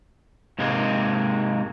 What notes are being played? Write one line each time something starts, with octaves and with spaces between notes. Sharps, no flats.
G#2 C3 G#3 A#3 C4